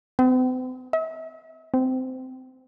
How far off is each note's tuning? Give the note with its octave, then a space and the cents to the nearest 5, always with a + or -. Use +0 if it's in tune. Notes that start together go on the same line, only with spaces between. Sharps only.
C4 -45
E5 -40
C4 -20